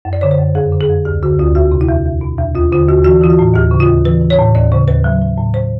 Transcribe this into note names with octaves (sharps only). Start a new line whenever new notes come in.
F#2
D5
D3 C#5
C5
F#2
F2 G#4
D3
G#4
F2
D2 G4
D3 F#4
D2 F4
E2 F#4
C3
E4
E2
E2
B2
E2
D#2 F4
D3 F4
D#2 F#4
E3 F#4
E3 F4
F#4
A2
D#2 G4
C#3
F4
D#2
E3 B4
E3
C#5
A2
D#2 D5
C#3 C5
D#2 B4
F#3
F#3
A2
C5